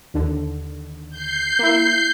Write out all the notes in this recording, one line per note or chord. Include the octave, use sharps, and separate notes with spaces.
D#2 D3
G6 C7
A#3 E4